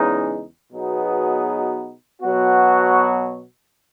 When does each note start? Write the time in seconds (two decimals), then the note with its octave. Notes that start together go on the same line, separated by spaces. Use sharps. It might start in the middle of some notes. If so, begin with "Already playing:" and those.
Already playing: E2 C#3 G#3 D#4
0.73 B2 F#3 B3 D#4 G#4
2.22 B2 F#3 B3 F#4